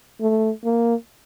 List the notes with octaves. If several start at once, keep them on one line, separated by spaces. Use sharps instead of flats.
A3
A#3